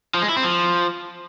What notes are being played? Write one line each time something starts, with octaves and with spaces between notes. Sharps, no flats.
F3
G#3
E4
C4
F3